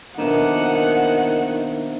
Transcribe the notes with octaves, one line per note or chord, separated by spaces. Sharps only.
B2 D#3 F3 A#3 D4 E5 F#5